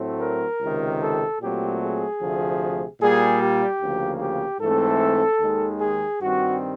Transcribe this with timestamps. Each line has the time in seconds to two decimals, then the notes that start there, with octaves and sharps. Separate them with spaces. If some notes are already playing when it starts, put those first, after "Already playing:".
Already playing: A2 F#3 A3 C4
0.21 A#4
0.61 C#2 C3 D#3
1.01 A4
1.41 A#2 F#3 A3 C4 G4
1.81 G#4
2.20 D2 C3 F3 A3
3.01 A#2 G3 A#3 G#4
3.41 G4
3.81 D2 C#3 F3 A#3
4.21 G4
4.60 G#2 E3 A3 C4 A4
5.40 D#2 D#3 G#3
5.80 G#4
6.20 G2 D#3 G3 C4 F#4